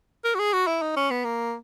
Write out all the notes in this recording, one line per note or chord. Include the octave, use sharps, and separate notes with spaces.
A#4
F#4
G#4
F#4
E4
D#4
C#4
B3
A#3